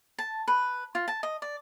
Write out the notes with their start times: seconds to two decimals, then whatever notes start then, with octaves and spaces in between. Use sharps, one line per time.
0.18 A5
0.48 B4
0.95 F4
1.08 A5
1.23 D#5
1.42 D5